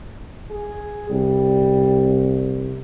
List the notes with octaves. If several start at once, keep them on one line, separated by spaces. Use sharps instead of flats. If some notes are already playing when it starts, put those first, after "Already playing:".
G#4
C2 G3